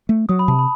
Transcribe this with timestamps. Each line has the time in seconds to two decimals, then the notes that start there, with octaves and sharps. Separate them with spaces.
0.09 A3
0.29 F#3 D#6
0.39 B5
0.48 C3 A5
0.59 B5